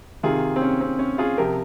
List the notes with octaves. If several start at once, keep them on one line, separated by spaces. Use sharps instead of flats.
C3 D#3 F4 G#4
C4
C#4
C4
C#4
F4 G#4
C3 F3 G4 A#4